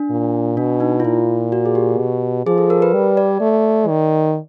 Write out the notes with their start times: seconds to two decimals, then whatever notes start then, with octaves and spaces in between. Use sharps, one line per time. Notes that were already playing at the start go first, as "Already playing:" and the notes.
Already playing: D4
0.10 A#2
0.57 B2 D4
0.80 D#4
1.00 F4
1.04 A#2 E4
1.52 F#4
1.65 G#4
1.75 G4
1.99 B2
2.46 F3 G#4
2.58 A4
2.70 A#4
2.82 B4
2.94 G3
3.17 D5
3.40 A3
3.88 D#3